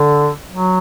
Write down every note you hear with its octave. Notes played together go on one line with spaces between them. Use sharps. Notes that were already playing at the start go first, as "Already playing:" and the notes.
Already playing: D3
F#3